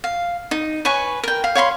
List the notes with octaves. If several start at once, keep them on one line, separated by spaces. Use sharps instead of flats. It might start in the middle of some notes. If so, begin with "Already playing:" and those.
F5
D#4
B4 C#5 G#5 C#6
A#4 G5
F5
C#5 F5 B5 C6